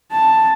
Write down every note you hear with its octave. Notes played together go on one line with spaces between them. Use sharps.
A5